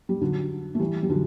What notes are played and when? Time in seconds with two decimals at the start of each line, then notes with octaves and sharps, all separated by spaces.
0.09 G3
0.21 D3 F#3
0.75 A3
0.79 E3 G3
1.03 G3
1.09 D3 F#3